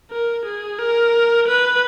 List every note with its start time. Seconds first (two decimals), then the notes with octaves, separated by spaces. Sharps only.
0.11 A#4
0.45 G#4
0.79 A#4
1.48 B4